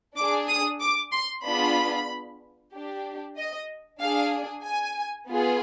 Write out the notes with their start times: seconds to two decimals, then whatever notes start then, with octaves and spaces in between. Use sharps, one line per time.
0.16 D4 G#4 D6
0.48 D#6
0.81 D6
1.12 C6
1.44 B3 D4 F4 G#4 B5
2.73 D4 G4
3.37 D#5
4.00 D4 G#4 F5
4.65 G#5
5.28 B3 F4 G#4